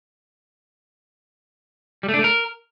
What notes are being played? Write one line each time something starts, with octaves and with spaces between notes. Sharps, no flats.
G3
A3
D4
A3
A#4